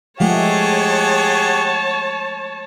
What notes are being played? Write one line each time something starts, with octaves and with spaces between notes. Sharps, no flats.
F3 G#3 A3 G4 G#4 C#5 F#5 A5